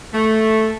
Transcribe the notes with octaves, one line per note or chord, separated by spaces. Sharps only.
A3